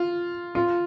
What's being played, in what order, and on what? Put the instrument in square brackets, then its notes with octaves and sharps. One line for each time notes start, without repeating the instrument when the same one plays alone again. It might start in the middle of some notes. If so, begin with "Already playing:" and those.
Already playing: [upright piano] F4
F4